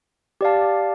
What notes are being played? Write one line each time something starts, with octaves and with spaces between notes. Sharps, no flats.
G4 D5 F5 A5